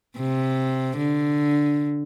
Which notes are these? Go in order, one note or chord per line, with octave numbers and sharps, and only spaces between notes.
C3
D3